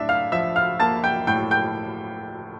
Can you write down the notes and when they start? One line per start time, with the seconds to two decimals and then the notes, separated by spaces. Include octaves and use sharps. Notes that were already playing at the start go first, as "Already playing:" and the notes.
Already playing: A2 D4 E5
0.09 F5 F6
0.32 F3 E5 E6
0.56 F5 F6
0.80 A#3 A5 A6
1.04 G5 G6
1.27 A2 G5 G6
1.51 G5 G6